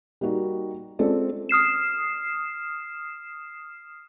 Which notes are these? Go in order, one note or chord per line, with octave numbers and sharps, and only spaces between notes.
G3 A#3 D#4 F#4
G#3 C4 C#4 F4 A4 D5
D#6 F6 C7 E7